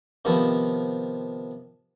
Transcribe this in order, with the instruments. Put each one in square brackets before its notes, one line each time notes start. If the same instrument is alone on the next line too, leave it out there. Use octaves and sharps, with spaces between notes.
[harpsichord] C3 D#3 F3 B3